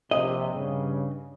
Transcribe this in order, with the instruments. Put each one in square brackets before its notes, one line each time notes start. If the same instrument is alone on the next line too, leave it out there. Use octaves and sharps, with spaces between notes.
[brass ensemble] A#1 C3 [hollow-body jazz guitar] D#5
[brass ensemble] G2 C#3